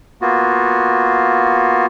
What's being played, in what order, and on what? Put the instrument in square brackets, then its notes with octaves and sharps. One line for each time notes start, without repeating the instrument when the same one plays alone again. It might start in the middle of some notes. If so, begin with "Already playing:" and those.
[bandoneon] A#3 B3 F4 F#4